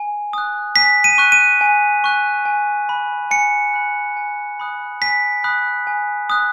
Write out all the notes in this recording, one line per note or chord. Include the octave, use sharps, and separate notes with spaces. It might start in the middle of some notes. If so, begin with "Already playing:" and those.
Already playing: G#5
D#6 F#6
G#5 B6
D#7
C#6 F#6
D#7
G#5
C#6 F#6
G#5
B5 F#6
G#5 C#7
B5 F#6
G#5
B5 D#6 F#6
G#5 B6
B5 D#6 F#6
G#5
D#6 F#6